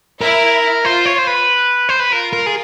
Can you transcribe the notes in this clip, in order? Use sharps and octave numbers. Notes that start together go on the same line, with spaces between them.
E4 A#4
F4 C5
C#5
C5
B4
C5
B4
F4 A#4
A#4
G#4